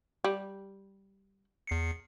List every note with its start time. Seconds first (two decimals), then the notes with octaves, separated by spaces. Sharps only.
0.24 G3
1.67 E2 C7 C#7